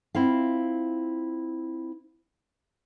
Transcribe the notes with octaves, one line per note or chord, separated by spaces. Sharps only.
C4 E4 F4 F5